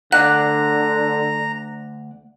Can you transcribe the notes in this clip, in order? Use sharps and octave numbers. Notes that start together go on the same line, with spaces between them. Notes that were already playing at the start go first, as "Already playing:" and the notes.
D2 D3 D5 F#5 A#5 F#6